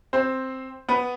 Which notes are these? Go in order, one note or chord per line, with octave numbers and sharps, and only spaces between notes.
C4 C5
B3 B4